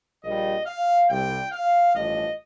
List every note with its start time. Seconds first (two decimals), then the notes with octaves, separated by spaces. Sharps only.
0.23 A#1 A#2 G3 D#5
0.66 F5
1.09 C2 C3 G3 G5
1.52 F5
1.95 A1 G2 F3 D#5